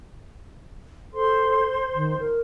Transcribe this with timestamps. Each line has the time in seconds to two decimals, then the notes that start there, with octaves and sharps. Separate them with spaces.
1.14 A4 C5 C6
1.95 D#3
2.18 A#4